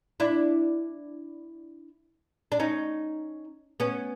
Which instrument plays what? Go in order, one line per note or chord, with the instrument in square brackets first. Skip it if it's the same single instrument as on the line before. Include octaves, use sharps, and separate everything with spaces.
[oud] D4 E4
D4
C#4 D#4
B3 C#4